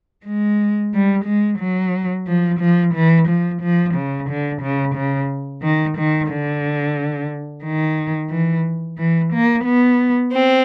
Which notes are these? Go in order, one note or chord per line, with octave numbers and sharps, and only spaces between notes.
G#3
G3
G#3
F#3
F3
F3
E3
F3
F3
C#3
D3
C#3
C#3
D#3
D#3
D3
D#3
E3
E3
A#3
B3
C4